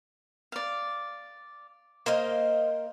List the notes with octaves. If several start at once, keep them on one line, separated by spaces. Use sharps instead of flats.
D5 F5
A#3 C5 D#5 F5